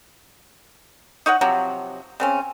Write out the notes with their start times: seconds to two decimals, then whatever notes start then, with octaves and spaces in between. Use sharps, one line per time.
1.26 D#4 C#5 D#5 F#5
1.41 C3 F3 F#3
2.20 C#3 C4 C#4